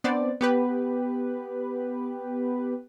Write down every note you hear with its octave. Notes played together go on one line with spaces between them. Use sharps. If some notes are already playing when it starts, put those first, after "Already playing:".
B3 C4 D4 C5 D5
B3 G4 B4